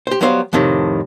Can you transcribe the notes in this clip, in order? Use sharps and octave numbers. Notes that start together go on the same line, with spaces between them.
G4 C5
F#3 G3 B3 C5 D#5 F5
F2 A2 C3 D#3